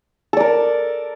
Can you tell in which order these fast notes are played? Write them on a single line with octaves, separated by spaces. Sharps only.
A4 D5 A#4